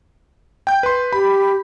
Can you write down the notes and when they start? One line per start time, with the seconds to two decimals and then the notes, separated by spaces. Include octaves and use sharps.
0.67 G5 G6
0.83 B4 C6
1.13 G4 B5